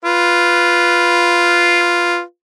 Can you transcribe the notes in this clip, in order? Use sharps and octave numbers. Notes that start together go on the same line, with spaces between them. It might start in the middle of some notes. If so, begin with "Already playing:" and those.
F4 B4